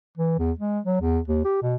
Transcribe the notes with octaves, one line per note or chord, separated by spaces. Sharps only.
E3
E2
G#3
F#3
E2
D#2
G4
B2